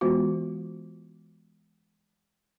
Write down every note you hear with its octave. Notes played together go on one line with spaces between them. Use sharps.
E3 G#3 B3 F4 F#4